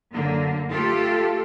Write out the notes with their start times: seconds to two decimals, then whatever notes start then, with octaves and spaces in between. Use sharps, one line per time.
0.13 F#2 D3 A#3
0.70 A3 F4 G4 A4